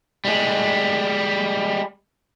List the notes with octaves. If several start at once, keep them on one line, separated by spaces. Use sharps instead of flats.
G3 G#3